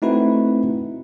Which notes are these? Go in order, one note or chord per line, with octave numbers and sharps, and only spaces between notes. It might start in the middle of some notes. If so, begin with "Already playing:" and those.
A3 C4 D#4 E4 F#4 B4